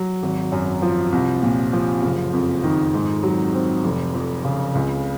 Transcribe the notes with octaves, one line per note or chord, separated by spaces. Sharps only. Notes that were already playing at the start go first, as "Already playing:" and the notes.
Already playing: F#3
G#1
F#2
F3
C2
A#2
F3
F#1
F2
D#3
G#2
F#3
C4
F1
F2
C#3
C#2